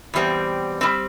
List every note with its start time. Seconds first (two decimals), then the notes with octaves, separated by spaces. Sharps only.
0.14 E2 B2 G3 C4
0.81 B2 G3 C4